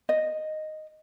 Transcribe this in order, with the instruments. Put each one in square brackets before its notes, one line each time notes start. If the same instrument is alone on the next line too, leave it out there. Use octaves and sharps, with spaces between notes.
[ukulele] D#5